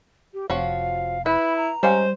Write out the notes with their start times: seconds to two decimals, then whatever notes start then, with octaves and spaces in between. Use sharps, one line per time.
0.34 G4
0.50 F1 F3 F#4 C#5 F5
1.26 E4 B4 B5
1.57 A#5
1.83 G3 G#3 C#4 C5 F5